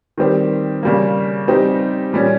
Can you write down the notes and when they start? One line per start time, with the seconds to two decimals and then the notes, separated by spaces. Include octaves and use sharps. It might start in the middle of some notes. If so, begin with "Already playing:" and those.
0.18 D#3 G3 C4 G4
0.83 C#3 G3 A#3
1.48 G3 C4 D#4 G4
2.13 A#2 G3 C#4